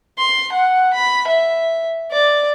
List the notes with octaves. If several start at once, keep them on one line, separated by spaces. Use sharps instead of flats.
C6
F#5
B5
E5
D5